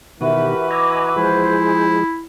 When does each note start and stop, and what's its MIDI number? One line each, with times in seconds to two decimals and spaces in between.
0.21 0.54 47
0.21 0.54 51
0.21 1.67 52
0.21 1.67 66
0.21 0.67 67
0.21 0.67 70
0.21 1.67 71
0.21 0.67 76
0.71 1.10 75
0.71 1.10 80
0.71 1.10 82
0.71 1.15 86
0.71 1.15 88
1.16 2.04 53
1.16 2.04 56
1.16 2.26 64
1.16 2.04 68
1.16 1.94 72